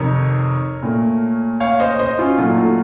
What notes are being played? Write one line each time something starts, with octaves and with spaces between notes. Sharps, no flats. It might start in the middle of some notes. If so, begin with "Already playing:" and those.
Already playing: F2 C3 D#3 A#4 C#5
A#2 A3
C#5 F5
C5 D#5
C5 D#5
C#4 F4
A#2 F#3 A3 F4 A4
F4 A4